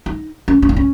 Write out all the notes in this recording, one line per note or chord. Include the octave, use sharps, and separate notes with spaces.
D#4
C#4
C#4
D#4
C#4